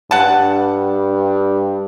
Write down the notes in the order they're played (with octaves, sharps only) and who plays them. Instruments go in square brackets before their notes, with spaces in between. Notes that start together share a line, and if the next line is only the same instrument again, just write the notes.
[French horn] G2 [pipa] F#5 A5